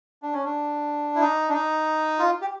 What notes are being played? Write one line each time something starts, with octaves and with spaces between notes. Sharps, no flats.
D4
C#4
D4
E4
D#4
D4
D#4
F4
G4